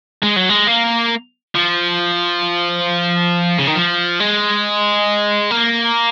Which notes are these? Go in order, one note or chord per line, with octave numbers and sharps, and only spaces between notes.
G#3
F#3
G#3
A#3
F3
C#3
D#3
F3
G#3
A#3